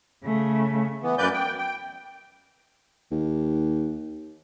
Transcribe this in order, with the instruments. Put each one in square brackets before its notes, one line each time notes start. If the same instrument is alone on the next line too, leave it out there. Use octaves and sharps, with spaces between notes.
[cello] C#3 A3
[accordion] E3 B3
F#2 A#3 B4 D5 G6
G5
G5
[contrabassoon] D#2